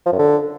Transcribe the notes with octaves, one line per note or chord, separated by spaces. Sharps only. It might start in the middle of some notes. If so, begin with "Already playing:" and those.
F3
F#2
D3